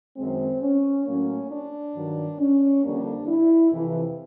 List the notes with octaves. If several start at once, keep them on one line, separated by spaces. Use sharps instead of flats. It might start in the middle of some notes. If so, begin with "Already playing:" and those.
F#2 D#3 G#3 C4
C#4
A2 F#3 A#3 C#4
D4
G2 D#3 F#3
C#4
F2 D3 G3 A#3 D4
E4
F2 C3 E3